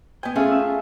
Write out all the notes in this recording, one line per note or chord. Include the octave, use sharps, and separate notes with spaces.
B3 G5 G#5
A3 C#4 F4 G#4
E5